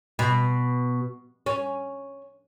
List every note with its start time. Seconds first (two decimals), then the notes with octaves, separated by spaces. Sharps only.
0.19 B2
1.46 C#4